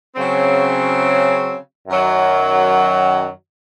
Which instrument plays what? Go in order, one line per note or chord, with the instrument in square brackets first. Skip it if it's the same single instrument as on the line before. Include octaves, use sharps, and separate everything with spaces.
[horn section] C#3 F#3 C4
F#2 D#3 F#3